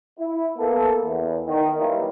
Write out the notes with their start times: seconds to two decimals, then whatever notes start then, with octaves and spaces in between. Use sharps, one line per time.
0.18 E4
0.57 A#3 B3 A4
1.03 E2
1.47 D#3
1.79 E3 F#3 G3 A#3 E4 F4